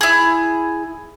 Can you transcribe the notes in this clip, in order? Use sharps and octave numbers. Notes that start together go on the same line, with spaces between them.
E4 G#4